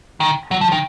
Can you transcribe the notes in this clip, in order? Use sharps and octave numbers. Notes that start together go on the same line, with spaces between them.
D#3
F#3
F3
D#3